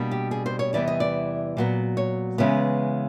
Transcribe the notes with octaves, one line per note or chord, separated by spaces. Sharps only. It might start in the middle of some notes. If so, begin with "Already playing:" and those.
Already playing: B2 G3 A#3 D4
G4
G#4
C5
C#5
E2 C3 E3 G3 B3 D5
D#5
D5
A#2 F#3 B3
C#5
C#3 E3 G#3 B3